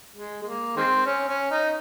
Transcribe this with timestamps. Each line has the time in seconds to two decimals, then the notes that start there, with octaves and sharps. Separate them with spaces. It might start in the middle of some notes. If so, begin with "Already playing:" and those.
0.16 G#3
0.42 G#3
0.45 A#3
0.77 D#3 G#3 C4
1.06 C#4
1.28 C#4
1.51 D#4